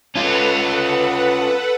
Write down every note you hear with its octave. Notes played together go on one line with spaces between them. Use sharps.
C#4 F4 A4 B4 F#5